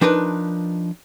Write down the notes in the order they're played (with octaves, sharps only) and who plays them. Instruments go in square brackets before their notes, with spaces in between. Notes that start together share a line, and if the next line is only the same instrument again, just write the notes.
[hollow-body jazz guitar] F3 D4 D#4 A#4 B4